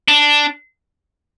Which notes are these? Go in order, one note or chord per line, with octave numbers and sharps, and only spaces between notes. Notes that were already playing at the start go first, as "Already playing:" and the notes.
D4